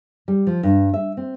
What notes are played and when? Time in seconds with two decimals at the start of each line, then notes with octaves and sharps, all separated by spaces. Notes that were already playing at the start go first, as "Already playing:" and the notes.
0.28 G3
0.47 F3
0.63 G2
0.94 E5
1.17 C4